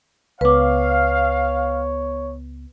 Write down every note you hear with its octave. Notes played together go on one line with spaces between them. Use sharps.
C#2 B3 B4 C#5 F5 D6